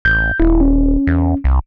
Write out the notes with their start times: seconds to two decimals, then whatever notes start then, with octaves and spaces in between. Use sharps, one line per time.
0.05 A1 G6
0.40 D#1 E4
0.61 C#4
1.07 E2
1.44 C2